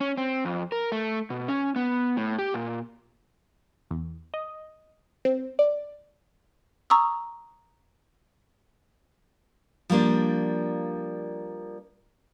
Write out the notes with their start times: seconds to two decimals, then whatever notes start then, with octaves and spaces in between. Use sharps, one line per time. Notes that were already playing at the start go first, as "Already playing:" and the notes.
0.01 C#4
0.17 C4
0.45 F2
0.72 A#4
0.92 A3
1.30 B2
1.48 C#4
1.76 B3
2.17 A2
2.39 G4
2.54 A#2
3.91 E2
4.34 D#5
5.25 C4
5.59 D5
6.90 A#5 C#6 D#6 E6
9.90 F3 G3 A#3 D4